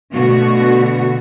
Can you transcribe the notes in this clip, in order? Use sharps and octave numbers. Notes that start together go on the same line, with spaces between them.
B2 D3 A3 F#4